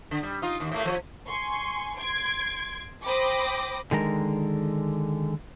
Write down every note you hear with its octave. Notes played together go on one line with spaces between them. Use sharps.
D3
G3
D#4 F4
D#2
A2 A3 A#3
F3 C5 C#5
G#5 C6 C#6
C6 G#6 D7
C5 G5 B5 D6 D#6 A#6
D3 D#3 G#3 A#4